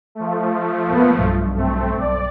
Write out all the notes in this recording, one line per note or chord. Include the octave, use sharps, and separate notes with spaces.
F3 A3
A#3 B3
B1 G2
A3 C4
B1 D5